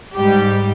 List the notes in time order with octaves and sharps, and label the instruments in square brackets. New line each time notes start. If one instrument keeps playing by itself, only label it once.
[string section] G#2 G3 G4